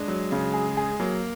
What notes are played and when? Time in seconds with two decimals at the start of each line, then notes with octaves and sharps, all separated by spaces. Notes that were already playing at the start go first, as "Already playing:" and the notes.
Already playing: G#3 D4
0.08 F#3
0.32 C#3
0.53 G#4
0.77 G#4
1.00 F#3 A#3